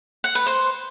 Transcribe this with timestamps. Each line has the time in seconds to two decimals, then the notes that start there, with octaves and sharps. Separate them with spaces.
0.24 F#5
0.35 B4
0.47 C5